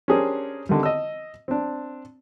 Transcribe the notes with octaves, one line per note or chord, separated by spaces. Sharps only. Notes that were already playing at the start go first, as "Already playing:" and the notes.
C#4 D4 G4 G#4 A#4 C5
D3 D#3 G3
D#5 E6
C4 D4